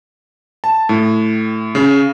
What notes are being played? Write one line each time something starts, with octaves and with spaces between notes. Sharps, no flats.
A5
A2
C#3